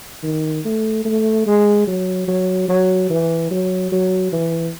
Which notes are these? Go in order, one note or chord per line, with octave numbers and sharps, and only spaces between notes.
D#3
A3
A3
G#3
F#3
F#3
F#3
E3
F#3
F#3
E3